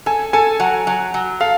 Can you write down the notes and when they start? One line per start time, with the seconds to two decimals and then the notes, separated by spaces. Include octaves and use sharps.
0.06 A4 G#5
0.33 A4 G#5
0.60 F#3 F#5
0.87 F#3
1.14 F#3
1.40 A4 F5